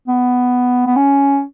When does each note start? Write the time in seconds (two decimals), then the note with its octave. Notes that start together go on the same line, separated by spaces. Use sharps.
0.08 B3
0.86 B3
0.96 C#4